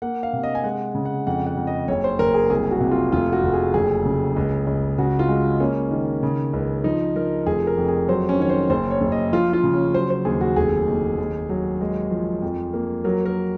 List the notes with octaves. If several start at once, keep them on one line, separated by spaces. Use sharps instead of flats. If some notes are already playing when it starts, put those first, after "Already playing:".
A#3 F#5
F5
C3
D#5
G#5
G#3 F#5
C#3
F#5
F2 F#5
F#5
F2
D#5
F#1 C#5
C5
F#1 A#4
G#4
C2 G#4
F#4
C3
F4
F1 F4
F#4
F1
G#4
F#1 G#4
C#3
C#2
C#2
C#3 F#4
F4
G#3
A#3 C#4
D#3
C#3
C#2
F3 D#4
F3 A#4
F1 G#4
A#4
F2
G#4
F#3 C5
C#4
D#3 C#5
C5
F#1 C5
C#5
F#1
D#5
F3 F4
F4
C#3
C#4
F#3 C5
C5
D#2 G#4
F#4
F1 G#4
D#2
D#2
F#3
G#3
F3
F2
A#3
F#3 A#4
A#4